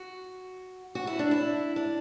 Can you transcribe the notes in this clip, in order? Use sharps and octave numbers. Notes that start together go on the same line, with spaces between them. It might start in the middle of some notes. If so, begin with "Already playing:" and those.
Already playing: F#4
F#4
E4
D4
E4
D4